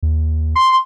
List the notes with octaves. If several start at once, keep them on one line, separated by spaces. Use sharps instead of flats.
D#2
C6